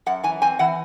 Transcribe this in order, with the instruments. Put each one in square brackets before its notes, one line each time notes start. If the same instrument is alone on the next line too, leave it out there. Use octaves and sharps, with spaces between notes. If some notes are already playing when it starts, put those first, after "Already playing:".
[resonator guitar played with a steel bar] F#2 F#5
E3 G#5
C4 G#5
E3 F#5